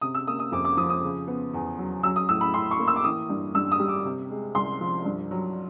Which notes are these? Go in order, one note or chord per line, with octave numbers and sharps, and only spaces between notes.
C3 D#6
E6
A#3 D#6
D#6
F2 D6
D6
F3 D#6
D#6
C#3
B3
E2
F#3
F#3 E6
D#6
A2 E6
B5
A2 C6
C#6
A#3
E6
D6
E3 D#6
G2
G2 E6
D#6
G3
D6
C3
G#3
C2 C6
F3
G2
F#3